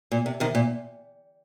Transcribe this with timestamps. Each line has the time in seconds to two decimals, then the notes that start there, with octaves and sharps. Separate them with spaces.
0.12 A#2
0.26 C3
0.40 C3 D#3
0.55 A#2